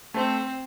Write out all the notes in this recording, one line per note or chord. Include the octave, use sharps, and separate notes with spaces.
A3 C4